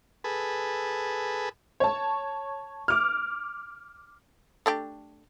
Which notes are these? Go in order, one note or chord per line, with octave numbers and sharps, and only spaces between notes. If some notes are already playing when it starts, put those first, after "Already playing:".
G#4 A4 B4
C#5 A5
D6 F6
A3 D4 G4